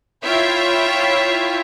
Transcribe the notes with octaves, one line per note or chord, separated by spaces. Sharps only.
E4 F4 C#5 E5 G5